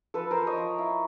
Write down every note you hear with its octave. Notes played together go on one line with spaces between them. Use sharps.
F3 A4 B4
A#4 C5
F3
C#5 D#5
F3
E4